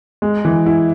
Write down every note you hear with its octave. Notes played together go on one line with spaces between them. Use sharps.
G#3
E3
E4